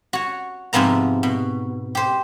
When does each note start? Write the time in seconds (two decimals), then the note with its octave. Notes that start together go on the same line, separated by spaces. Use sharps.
0.13 F#4 C#5
0.73 G#2 C3 F3 B3 A#5
1.23 B2
1.95 G4 C5